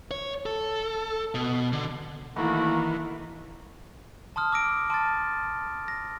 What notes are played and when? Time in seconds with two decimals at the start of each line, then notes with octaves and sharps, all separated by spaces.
0.11 C#5
0.46 A4
1.35 B2
1.73 D3
2.36 D#3 E3 A3 A#3 E4 F#4 B5
4.36 A5 C6 D#6 F6
4.52 D6 E6 A#6 D7
4.90 A5 C6 F6 A6
5.88 A#6